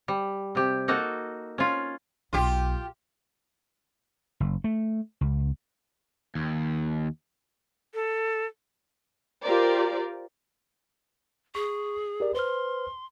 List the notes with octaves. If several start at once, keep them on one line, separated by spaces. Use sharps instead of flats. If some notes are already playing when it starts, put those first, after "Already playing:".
G3
C3 G4
A#3 D#4 F#4 A4
C#4 F4
B1 B3 F4 G4
F#1
A3
C#2
D#2
A4
F4 G4 A#4 C5 D5
G#4 C#6
G4 A#4 D5
B4 C5 C6 F6